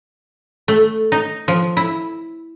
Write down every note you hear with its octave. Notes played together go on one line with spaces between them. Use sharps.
A3
D#4
F3
E4